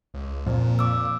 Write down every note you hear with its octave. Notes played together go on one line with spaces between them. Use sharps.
C#2
F2 A#2
D6 E6